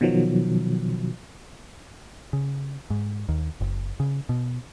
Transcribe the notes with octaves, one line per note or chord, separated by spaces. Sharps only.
B2 D#3 F3 F#3
C#3
G#2
D#2
F#1
C#3
B2